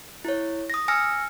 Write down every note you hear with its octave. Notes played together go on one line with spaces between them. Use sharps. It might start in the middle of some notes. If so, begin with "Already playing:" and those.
E4 C#5
D#6 A#6
G#5 E6 F6 A#6 C#7